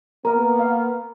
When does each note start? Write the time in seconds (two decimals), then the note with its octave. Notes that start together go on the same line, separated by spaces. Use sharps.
0.25 A#3 B3 A#4 A#5
0.59 F5